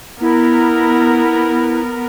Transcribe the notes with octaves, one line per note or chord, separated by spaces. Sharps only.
B3 E4 A#4